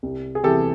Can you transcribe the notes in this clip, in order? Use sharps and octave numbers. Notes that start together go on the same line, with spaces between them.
C2
G#4
C3 E3 G3 G4 A4